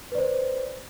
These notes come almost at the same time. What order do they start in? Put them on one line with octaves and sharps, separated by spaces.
B4 D5 C5